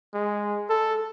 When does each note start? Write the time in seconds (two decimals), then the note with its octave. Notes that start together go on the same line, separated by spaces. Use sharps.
0.14 G#3
0.70 A4